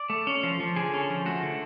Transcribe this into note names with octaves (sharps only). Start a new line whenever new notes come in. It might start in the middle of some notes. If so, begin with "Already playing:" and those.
Already playing: D5
A3
C#4
F3
F3
D3 G#4
C#4
F3
A3 F#4
D3